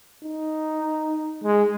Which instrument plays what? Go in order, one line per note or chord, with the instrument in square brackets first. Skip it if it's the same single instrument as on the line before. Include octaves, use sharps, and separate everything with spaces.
[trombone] D#4
G#3